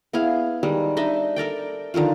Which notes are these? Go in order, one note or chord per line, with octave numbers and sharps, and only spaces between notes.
B3 E4 G#4 F5
D#3 G3 G#3
D4 D#4 D#5 E5
A4 A#4 D5 G5
D3 D#3 F3 F4